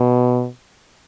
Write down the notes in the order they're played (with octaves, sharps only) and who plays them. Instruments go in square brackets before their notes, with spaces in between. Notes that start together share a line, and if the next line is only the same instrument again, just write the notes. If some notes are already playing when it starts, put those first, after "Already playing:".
Already playing: [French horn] B2